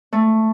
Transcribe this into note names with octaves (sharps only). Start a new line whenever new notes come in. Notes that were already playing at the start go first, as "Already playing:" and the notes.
A3